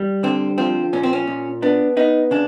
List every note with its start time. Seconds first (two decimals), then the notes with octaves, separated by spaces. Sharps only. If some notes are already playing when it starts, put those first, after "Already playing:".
Already playing: G3
0.23 D3 C4
0.58 F3 C4
0.93 A#2 C#4
1.03 C4
1.13 C#4
1.27 A#2
1.62 B3 D4
1.97 B3 D#4
2.31 C#3 D4